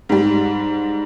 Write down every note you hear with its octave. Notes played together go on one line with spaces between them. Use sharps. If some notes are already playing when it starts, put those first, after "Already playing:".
G#2 G3